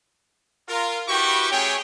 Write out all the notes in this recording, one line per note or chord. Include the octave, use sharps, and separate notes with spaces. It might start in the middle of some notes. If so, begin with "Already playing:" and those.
F4 A#4
E4 F#4 G4 B4 G5 C#6
A3 C#4 G#4 C#5 G5